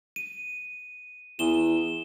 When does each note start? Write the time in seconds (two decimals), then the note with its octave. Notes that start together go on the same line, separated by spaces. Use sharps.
0.16 D#7
1.39 E2 E7 G7